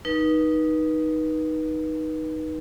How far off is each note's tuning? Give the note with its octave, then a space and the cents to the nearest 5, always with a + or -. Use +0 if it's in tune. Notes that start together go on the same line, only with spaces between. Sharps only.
D#4 +0 B4 -30